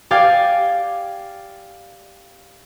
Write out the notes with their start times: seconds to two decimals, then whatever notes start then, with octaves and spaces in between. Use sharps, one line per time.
0.11 G4 D5 F5 G5 G#5